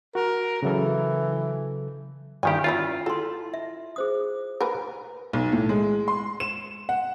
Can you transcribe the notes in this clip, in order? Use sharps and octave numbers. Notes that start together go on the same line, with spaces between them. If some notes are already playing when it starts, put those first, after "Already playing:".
F#4 A#4
C#3 E3 F#3 A4
G2 D#3 E4 G4 G#5
E3 C#4 E4 F4
E4 A4 C6
E5
G#4 C5 D#6
A#4 B4
B1
A2
G#3
C6
E7
F#5